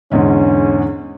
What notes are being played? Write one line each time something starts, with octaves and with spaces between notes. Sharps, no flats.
E2 G#2 D3 C#4